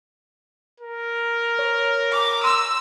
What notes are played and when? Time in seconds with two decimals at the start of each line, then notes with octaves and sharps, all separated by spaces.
0.80 A#4
1.59 C#5
2.12 D6
2.44 C6 E6